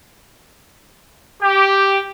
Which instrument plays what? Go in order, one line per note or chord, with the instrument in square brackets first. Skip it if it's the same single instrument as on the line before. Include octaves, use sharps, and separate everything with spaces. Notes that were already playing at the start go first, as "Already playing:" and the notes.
[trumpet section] G4